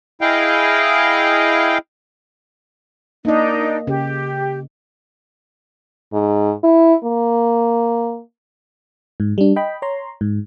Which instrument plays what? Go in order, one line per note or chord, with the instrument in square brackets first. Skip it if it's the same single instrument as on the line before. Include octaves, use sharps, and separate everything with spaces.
[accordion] E4 G#4 D#5 F5 G5
[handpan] A#3 D#5 [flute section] D4 D#4 A#4
[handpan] C#3 [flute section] G4
[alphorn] G#2
E4
A#3
[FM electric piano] G#2
G3 D4
D#5 G5 B5
C#5 A#5 C6
G#2